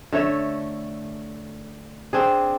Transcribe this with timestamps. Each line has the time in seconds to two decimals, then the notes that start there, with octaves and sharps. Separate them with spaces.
0.12 D3 A3 C#5 E5
2.13 C4 D4 G#4